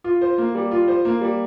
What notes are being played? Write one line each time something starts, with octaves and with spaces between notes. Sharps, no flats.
F4
C5
A#3
G3
F4
C5
A#3
G3